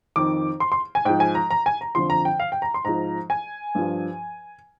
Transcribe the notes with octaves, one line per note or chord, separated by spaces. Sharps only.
F2 D#3 D6
C6
C6
G#5
G#2 F3 G5
G#5
A#5
A#5
G#5
A#5
F2 D3 F3 C6
A#5
G5
F5
G5
A#5
C6
G#2 F3 A#5
G#5
G2 F3